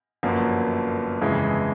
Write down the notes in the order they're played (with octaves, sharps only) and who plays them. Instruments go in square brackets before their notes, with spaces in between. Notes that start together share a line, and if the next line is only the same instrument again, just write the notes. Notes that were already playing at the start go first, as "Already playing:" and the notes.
[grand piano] G1 F#2 D3 F3 A#3
G1 F2 C#3 E3 G#3